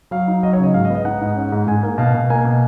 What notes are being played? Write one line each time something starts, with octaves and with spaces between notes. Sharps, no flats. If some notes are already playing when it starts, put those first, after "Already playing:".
F#3 F5
D#4
F#3 D#5
C#5
C#3 D#5
G#2 F5
D#5
B3
D#5
D#4 F#5
G#2
C#4
G#2
G#2 G#5
A#3
B2 F5
B2
A#3 G#5
B2